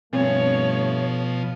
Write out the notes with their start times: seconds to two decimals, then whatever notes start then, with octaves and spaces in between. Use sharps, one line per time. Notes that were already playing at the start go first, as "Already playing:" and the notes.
0.13 G2 B2 F3 A3 C4 C#5